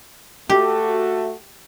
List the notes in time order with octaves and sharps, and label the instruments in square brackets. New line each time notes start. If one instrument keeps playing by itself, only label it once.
[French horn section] A3 F#4 [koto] G4